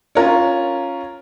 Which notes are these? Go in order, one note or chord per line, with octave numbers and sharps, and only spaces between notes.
C#4 F4 A#4 C#5